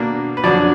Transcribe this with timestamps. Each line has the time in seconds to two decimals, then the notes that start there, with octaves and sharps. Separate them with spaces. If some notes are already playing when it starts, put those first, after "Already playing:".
Already playing: B2 A#3 D4
0.37 B4
0.44 F2 D3 F#3 D4 D5